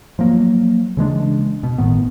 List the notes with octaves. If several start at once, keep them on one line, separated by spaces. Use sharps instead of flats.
F3 F#3 A#3
C#3 E3 G#3 D4
B2
G1 A2 D#3 B3